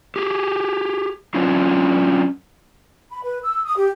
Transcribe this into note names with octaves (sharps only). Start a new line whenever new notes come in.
G4 G#4
F#3 C#4 D4 E4 F4
B5
B4
E6
D#6
G4